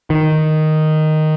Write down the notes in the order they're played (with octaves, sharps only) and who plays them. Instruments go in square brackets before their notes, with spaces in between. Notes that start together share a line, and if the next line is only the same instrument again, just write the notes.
[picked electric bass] D#3